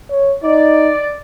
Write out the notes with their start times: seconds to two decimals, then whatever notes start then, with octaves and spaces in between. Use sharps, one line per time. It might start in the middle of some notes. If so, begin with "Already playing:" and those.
0.11 C#5
0.43 D#4 D5